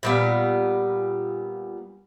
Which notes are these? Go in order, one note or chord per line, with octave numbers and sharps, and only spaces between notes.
A#2 G3 B3